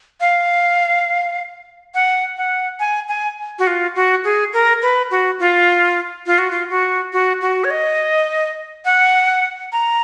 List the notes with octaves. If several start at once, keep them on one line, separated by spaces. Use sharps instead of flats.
F5
F#5
F#5
G#5
G#5
F#4
F4
F#4
G#4
A#4
B4
F#4
F4
F4
F#4
F4
F#4
F#4
F#4
C#5
D#5
F#5
A#5